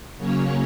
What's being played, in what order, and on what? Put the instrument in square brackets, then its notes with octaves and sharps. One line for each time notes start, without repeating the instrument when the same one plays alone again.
[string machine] C#3 F#3 A#3 C#4 C#5